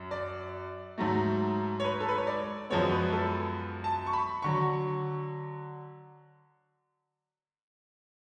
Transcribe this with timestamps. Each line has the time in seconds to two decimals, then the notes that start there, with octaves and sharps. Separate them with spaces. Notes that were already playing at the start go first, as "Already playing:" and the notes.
Already playing: F#2
0.11 D5
0.98 G#2 F#3 A3
1.80 C#5
1.84 B4
2.00 A4
2.09 B4
2.18 C#5
2.27 D5
2.70 F#2 F3 G#3 B3 C#5
2.92 B4
3.13 A4
3.84 A5
4.07 C#6
4.13 B5
4.42 D3 F#3 C#6